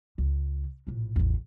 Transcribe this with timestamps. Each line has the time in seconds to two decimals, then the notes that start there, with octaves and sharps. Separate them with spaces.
0.18 C#2
0.87 A#1 A2
1.16 A1 E2